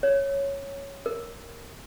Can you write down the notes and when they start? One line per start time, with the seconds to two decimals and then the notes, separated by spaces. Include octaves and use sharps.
0.03 C#5
1.06 A#4